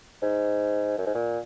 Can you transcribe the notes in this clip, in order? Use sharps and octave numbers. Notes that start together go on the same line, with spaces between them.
G#2
F#2
G#2
A#2